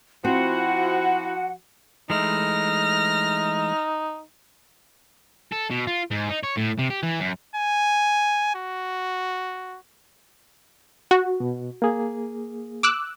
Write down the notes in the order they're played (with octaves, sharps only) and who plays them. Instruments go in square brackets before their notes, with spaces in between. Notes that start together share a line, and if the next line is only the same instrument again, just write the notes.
[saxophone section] F3 F#4 [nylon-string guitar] C4 [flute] E4 [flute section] F#5
[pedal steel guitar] E3 G#3 A3 [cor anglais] D#4 [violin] F6 A#6
[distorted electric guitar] A4
B2
F4
G#2
D#4
C#5
A2
C3
G4
E3
F#2
[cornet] G#5
F#4
[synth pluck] F#4
[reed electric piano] B2
A#3 G#4
[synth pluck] D6 E6 F#6